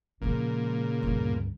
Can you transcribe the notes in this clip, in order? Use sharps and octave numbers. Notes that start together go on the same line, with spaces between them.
A#2 C#3 F3 G#3
D2 G2